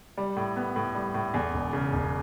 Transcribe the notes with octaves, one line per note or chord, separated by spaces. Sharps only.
G3
A2
B3
A2
G3
A2
E2
E1
C#3
E1